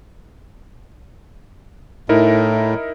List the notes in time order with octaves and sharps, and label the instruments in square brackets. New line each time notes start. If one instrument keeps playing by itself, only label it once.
[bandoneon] A2 [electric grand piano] D#4 E4 A#4